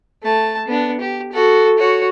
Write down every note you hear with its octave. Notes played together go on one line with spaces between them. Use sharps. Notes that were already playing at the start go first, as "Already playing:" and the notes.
A3 A5
B3 D4
G4
F#4 A4
F#4 C#5